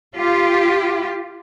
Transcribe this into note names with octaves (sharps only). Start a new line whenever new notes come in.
F4 G4